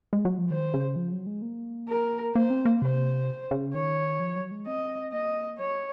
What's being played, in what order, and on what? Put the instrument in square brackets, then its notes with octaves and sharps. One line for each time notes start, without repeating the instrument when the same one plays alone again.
[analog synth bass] G#3
F#3
F3
[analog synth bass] D#3 [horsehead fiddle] C5
[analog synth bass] C#3
F3
F#3
G#3
A#3
[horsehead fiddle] A#4
[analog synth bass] A#3 [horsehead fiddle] C5
[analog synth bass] C4
A#3
[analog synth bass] C3 [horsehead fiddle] C5
[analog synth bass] C#3
[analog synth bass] D#3 [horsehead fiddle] C#5
[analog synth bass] F3
F#3
G#3
[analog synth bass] C4 [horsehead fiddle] D#5
[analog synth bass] A#3 [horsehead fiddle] D#5
[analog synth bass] F#3 [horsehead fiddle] C#5